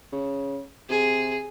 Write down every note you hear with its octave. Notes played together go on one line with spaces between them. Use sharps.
C#3
C3 G#4